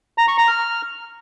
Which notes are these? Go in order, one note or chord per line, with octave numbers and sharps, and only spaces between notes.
A#5
C#6
A#5
F6